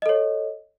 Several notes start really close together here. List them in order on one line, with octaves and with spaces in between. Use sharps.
D#5 A4 C#5